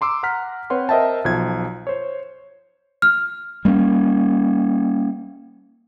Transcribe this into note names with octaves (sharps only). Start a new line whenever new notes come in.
A#5 C6 D6 E6
F#5 A#5 F6 B6
C4 B4 C#5 F#5 C6
A#4 C5 D#5 E5 G5 A5
B1 F3 G#6
C5 C#5
F6
G3 A#3 B3 C#4